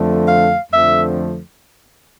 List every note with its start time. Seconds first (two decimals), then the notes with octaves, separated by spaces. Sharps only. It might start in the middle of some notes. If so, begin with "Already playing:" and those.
Already playing: F2 D3 F3 A3
0.28 F5
0.71 F2 D3 F3 A3 E5